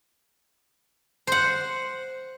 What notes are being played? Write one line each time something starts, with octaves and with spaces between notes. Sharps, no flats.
C5 F#5